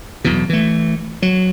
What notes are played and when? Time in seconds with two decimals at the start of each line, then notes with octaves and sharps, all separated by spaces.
0.24 B1 E2 B2
0.50 E3 A3
1.22 F#3